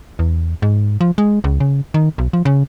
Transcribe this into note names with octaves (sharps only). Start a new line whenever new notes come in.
E2
G#2
F3
G#3
C#2
C#3
D#3
B1
F3
C#3